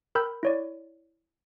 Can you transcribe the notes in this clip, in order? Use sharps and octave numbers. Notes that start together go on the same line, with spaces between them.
A#4 G5 B5 E6 G6
E4 C#5 D5